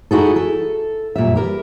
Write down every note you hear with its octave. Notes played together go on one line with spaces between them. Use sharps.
D#4 E4 F#4 G#4 A4
A4
F#2 A#2 G3 E5
G4 A#4 B4